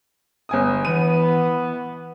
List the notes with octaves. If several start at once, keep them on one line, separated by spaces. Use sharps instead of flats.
G1 G#5 D#6
E3 B3 D#7